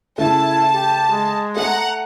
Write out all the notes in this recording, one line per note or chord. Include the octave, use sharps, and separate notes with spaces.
C#3 A3 E4 A5
G4
G#3
A3 F#5 A#5